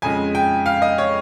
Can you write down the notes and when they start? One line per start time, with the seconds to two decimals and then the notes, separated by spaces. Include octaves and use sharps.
0.02 F2 C#3 G#3 G#5
0.35 G5
0.66 F5
0.82 D#5
0.98 C#5